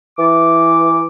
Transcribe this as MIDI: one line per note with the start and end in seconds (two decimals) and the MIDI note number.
0.18 1.04 52
0.18 1.04 86